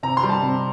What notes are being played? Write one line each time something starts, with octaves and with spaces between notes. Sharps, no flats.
C3 A#5
C6
G3
A5
C3